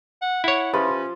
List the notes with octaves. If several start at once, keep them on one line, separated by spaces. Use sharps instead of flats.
F#5
E4 C#5 F#5
F3 C#4 F4 G4 B4 E5